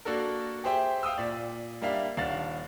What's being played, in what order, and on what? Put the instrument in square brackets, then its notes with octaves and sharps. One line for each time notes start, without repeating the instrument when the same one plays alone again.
[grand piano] A#3 D4 F#4 A4 A#4
G4 G#4 C5 E5 G5
F5 G5 D#6 E6
A#2 D5
G3 A#3 D4 E5 F5
D#1 D4 F5 F#5 A6